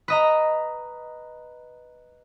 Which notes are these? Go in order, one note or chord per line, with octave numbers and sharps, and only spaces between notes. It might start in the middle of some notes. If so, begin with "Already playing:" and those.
B4 D#5 A#5